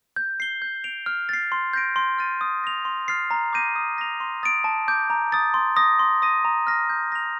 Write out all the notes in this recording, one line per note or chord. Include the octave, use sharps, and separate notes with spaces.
G6
C7 G7
G6
D7 F7
F6
A6 C7
C6
G6 A#6 D7
C6
F6 A6 D#7
D#6
A#6 F7
C6
F6 A6 C7
A#5
D6 G6 A#6 D#7
D#6
A#6 F7
C6
D#6 A6 D7
A5
D6 G6 D7
A#5
D#6 A6
C6
D#6 A#6
C6
D#6 A#6 D#7
A#5
F6 A#6
G6
A#6 F7